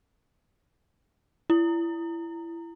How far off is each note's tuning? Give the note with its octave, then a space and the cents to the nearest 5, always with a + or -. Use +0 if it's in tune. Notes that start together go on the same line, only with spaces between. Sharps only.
E4 +25